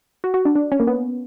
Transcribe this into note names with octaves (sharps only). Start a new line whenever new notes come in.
F#4
F#4
D4
D4
C#4
A#3
B3